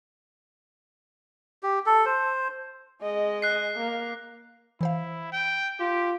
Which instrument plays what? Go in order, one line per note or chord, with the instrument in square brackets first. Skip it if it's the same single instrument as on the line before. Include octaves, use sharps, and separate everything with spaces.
[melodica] G4
A4
C5
[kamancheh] G#3 D#5
[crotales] F#6 C7
[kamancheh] A#3
[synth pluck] E3 C5 F5 [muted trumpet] E4
[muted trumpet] G5
[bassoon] F4 [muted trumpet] G4